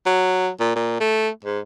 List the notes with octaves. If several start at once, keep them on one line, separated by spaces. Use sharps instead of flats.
F#3
A#2
A#2
A3
G#2